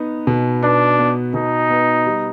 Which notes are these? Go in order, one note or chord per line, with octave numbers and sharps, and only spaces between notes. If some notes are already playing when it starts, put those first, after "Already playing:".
Already playing: B3 D#4
B2
B3 D4
B3
B2 D#4
B3
G3